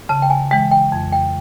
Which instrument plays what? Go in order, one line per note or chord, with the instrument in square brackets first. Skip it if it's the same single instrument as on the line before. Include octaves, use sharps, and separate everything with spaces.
[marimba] C#3 [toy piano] A5
[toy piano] G5
G#5
[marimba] E3 G#3 [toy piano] G5
[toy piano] G5
[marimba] F2
[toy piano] G5